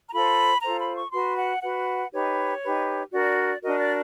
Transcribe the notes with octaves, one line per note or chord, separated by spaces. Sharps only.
A#5
F4 A4 C5 B5
F4 A4 C5 A#5
B5
C#6
F#4 B4 C6
F#5
F#4 B4 F#5
D#4 G4 B4 C#5
D#4 G4 B4
D4 F#4 A#4 D5
D4 F#4 A#4 D#5
D5